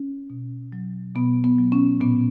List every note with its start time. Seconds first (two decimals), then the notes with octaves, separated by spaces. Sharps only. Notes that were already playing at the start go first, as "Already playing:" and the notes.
Already playing: C#4
0.30 B2
0.72 F#3
1.15 B2 B3
1.44 B3
1.58 F#3
1.72 C#4
2.01 A#2 B3